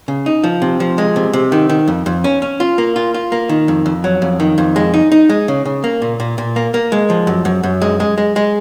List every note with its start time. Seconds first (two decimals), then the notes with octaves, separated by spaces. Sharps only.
0.08 C#3
0.26 D#4
0.44 F3
0.62 C3
0.80 F3
0.98 G#3
1.16 C3
1.33 C3
1.52 D#3
1.69 D#3
1.88 F2
2.06 F2
2.24 C#4
2.42 C#4
2.60 F4
2.78 A#3
2.96 F4
3.14 F4
3.32 A#3
3.49 D#3
3.68 F2
3.86 F2
4.04 F#3
4.22 F2
4.40 D#3
4.58 F2
4.76 G#3
4.94 D#4
5.12 D#4
5.29 G#3
5.48 C#3
5.65 C#3
5.84 A#3
6.02 A#2
6.20 A#2
6.38 A#2
6.56 A#3
6.74 A#3
6.92 G#3
7.10 F3
7.27 F#2
7.45 F#2
7.63 F#2
7.82 G#3
8.00 G#3
8.18 G#3
8.36 G#3